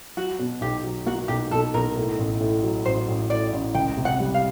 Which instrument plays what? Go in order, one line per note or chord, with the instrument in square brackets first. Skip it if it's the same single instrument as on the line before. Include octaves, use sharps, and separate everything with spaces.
[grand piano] F#3 [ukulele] F#4
[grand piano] B2
[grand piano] B1 [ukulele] G4
[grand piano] F#3
[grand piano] A#3 [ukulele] F#4
[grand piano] B1 [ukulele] G4
[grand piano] B1 [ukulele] A4
[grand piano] B1 [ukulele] A#4
[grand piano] A2
A1
A2
F#3
[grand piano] A1 [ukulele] C5
[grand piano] A1
[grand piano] A2 [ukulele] D5
[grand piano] A1
[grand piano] C#2 [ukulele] G5
[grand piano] C3
[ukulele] F#5
[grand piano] G3
[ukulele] F5